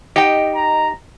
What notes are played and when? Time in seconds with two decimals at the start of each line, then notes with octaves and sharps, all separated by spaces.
0.16 D#4 G4 D#5 G5
0.55 A#5